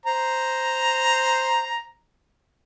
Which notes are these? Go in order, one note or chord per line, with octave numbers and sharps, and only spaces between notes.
C5 A#5